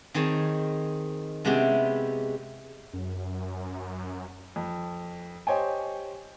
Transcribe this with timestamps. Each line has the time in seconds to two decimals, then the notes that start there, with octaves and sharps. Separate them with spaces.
0.14 D#3 C4 D#4 G#4 C#5 A5
1.45 C3 G#3 B3 C#4 E4 G4
2.93 F#2
4.56 F2
5.47 G4 C5 C#5 D#5 G5 G#5